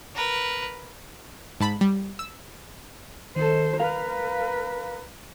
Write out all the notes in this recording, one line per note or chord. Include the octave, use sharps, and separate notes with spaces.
A#4 B4
G#2 A5 B5
G3
E6
D#3 A4 C5
A#4 B4 F5